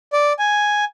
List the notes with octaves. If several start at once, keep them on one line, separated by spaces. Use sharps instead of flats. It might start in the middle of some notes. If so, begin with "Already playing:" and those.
D5
G#5